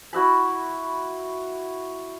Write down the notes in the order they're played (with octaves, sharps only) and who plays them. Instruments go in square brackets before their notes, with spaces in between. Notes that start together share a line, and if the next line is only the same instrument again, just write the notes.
[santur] E4 F#4 E5 B5